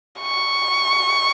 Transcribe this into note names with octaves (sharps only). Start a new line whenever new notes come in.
C#6